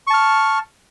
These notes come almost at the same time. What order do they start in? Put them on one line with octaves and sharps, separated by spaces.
C#6 A5 F6